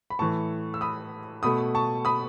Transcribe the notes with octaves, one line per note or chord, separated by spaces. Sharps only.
B5
A2 E3 A3 A5 C#6
E6
B5 D#6
B2 A3 B5 D#6
A5 C#6
B5 D#6